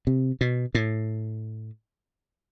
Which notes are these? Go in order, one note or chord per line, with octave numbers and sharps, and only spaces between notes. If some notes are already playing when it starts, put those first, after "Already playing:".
C3
B2
A2